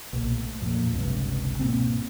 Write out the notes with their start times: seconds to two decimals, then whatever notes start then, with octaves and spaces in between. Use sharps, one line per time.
0.13 B1 A#2
0.37 A2
0.61 F2 A#2
0.92 G1 C#2 G2 C3
1.59 G#2 B2 A#3 C4